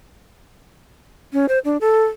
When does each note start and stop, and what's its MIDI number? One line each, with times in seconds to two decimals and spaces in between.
1.33 1.46 61
1.49 1.59 72
1.65 1.77 62
1.81 2.05 69